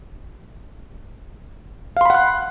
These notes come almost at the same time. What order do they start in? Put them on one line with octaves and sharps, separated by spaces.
F5 C6 B5 F#5 F#6